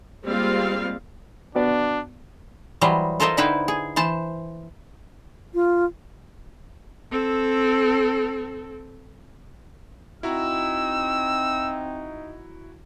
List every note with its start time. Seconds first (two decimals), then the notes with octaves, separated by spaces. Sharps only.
0.24 G3 G#3 A#3 C4 F4 F5
1.55 B2 B3 D4 D5
2.81 E3 F#3 G3 C5 D#5
3.20 F4 A4 A#4 C5 D#5 E5
3.37 D3 D#4 E4 B4 C5 G5
3.68 G#4
3.96 E3 C5 A5
5.54 F4
7.12 C4 A4
10.23 C4 D#4 E4 F#4 A#5 E6